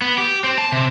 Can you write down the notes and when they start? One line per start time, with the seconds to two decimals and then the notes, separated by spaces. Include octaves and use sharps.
0.02 B3
0.18 G4
0.44 C4
0.58 A5
0.72 C3